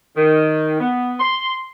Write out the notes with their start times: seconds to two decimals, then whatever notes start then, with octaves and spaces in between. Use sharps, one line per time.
0.16 D#3
0.80 B3
1.20 C6